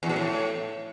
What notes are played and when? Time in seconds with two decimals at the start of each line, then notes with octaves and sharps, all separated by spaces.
0.03 E2
0.09 B2
0.16 A2